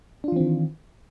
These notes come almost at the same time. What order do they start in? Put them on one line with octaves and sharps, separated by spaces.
D4 F4 E3 C4 D#3